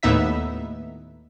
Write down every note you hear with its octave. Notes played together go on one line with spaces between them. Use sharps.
D#2 A2 B3 D#4 E5 B6